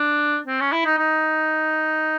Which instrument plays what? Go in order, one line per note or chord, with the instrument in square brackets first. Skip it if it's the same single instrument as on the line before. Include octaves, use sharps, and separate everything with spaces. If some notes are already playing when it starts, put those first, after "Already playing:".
Already playing: [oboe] D4
C4
C#4
E4
D#4
D#4